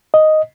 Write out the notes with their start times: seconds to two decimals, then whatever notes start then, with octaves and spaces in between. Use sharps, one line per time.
0.14 D#5